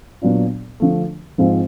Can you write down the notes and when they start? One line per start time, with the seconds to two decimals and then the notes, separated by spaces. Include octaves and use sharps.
0.22 A#2 F#3 B3 D4 F4
0.80 D3 F3 A3
1.38 G#2 F3 G#3 C4 F4